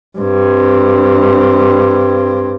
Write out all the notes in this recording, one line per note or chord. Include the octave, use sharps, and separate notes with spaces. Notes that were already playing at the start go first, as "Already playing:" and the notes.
G2 C4